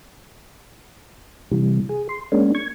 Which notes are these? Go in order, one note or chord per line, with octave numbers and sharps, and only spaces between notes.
C3 E3 G3
G#4
C6
G#3 A#3 C#4 D4
C#6 G#6